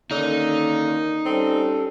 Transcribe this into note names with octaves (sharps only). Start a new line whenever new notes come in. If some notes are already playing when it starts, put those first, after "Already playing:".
D3 D#3 A#3 C#4 D#4
G3 C4 C#4 A4